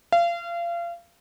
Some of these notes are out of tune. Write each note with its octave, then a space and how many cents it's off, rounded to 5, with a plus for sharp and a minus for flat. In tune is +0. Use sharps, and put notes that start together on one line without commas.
F5 -30